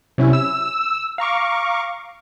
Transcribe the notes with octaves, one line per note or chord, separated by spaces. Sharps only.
C3 F#3 C#4 E4
E6
F5 A#5 C#6 D6